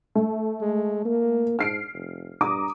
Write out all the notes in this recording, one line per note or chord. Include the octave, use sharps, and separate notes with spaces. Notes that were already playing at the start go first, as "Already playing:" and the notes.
A3
G#3
A#3
G#2 F6 C7 D7
F1
G2 A#5 D6 D#6